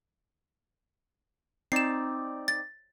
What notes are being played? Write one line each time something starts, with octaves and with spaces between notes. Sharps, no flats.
C4 D#4 D5 C7 E7
A6